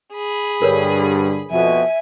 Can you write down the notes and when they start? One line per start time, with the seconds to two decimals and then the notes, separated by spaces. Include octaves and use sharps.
0.14 G#4 B5
0.62 G2 D3 G3 A#4 B4 C#5
1.51 F2 B2 E5 G#5